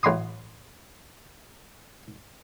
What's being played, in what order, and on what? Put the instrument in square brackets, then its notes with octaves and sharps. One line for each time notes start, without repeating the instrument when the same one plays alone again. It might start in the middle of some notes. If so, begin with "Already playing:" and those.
[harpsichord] A1 F#3 B5 C6 D#6